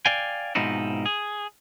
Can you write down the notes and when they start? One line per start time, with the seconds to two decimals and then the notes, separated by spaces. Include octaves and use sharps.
0.06 D5 F5 G5 G#5
0.55 G#2 B2 F3 C4 D#4 E4
1.06 G#4